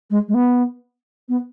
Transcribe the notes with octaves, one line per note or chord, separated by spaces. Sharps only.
G#3
G#3
B3
B3